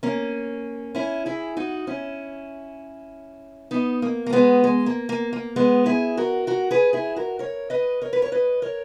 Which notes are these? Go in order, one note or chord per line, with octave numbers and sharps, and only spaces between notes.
A#3 C#4
C#4 E4
E4 G#4
D#4 F#4
C#4 E4
B3 D#4
A#3
A#3
G#3 B3
G#3
A#3
A#3
A#3
G#3 B3
E4 G#4
F#4 A#4
F#4 A#4
G#4 B4
E4 G#4
F#4 A#4
A#4 C#5
B4 D#5
A#4 C#5
B4
C#5
B4 D#5
A#4 C#5